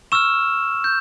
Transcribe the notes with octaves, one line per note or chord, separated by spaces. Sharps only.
C#6 E6 F6 E7
G6